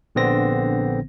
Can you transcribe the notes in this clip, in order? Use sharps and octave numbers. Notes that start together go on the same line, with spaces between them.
A#1 D3 B3 C4 A#6